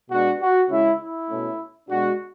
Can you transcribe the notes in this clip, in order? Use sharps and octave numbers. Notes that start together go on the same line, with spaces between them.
B2 G#3 B3 D4 F#4
F#4
C#3 G#3 C#4 E4
E4
B2 A3 C#4
B2 G#3 D4 F#4